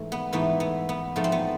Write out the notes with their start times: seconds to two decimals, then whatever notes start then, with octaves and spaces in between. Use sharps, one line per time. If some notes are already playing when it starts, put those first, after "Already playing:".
Already playing: G#2 E3 A3
0.12 B3
0.33 G#2 E3 A3 B3
0.60 B3
0.89 B3
1.16 G#2 F3 A3 B3
1.24 C4
1.32 B3